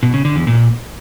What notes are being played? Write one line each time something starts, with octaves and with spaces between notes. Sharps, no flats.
B2
C#3
D3
E2
A#2